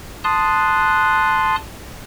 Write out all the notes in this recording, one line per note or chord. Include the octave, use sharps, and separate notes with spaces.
A5 C6 D#6 F#6